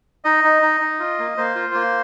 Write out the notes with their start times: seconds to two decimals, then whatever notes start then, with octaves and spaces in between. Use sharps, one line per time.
0.25 D#4 D#5
0.44 D#4
0.62 D#4
0.81 D#4
0.99 F4
1.19 A#3
1.37 A#3 C5
1.55 F4
1.74 A#3